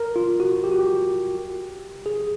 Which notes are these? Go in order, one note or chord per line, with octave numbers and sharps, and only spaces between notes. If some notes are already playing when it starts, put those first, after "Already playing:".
Already playing: A#4
F4
F#4
G4
F#4
G4
G#4